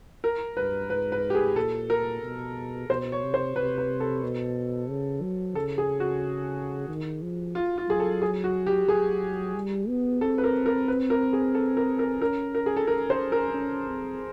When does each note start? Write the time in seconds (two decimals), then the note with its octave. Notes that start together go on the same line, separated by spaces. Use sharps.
0.24 A#4
0.57 G2 B4
0.90 G#2 B4
1.12 B4
1.30 G4
1.35 G#4
1.56 A#2 A4
1.90 A#4
2.23 B2
2.89 B2 C5
3.12 C#5
3.23 C3
3.34 C5
3.56 C3 B4
3.78 B4
4.00 A4
4.23 B2
4.90 C#3
5.22 F#3
5.55 C#3 A4
5.78 G#4
6.00 F#4
6.88 D#3
7.22 F3
7.55 F4
7.78 F4
7.89 F#3 G#4
8.00 A4
8.22 G#4
8.44 F#4
8.67 G4
8.89 F#3 G#4
9.55 G3
9.88 B3
10.21 C4 A4
10.38 B4
10.44 A#4
10.66 A#4
10.88 B4
11.10 A#4
11.33 G#4
11.55 A4
11.77 A#4
11.99 A#4
12.21 C#4 A#4
12.55 A#4
12.66 G#4
12.76 A4
12.87 C#4 A#4
13.10 C5
13.32 A#4
13.54 C#4
13.88 C4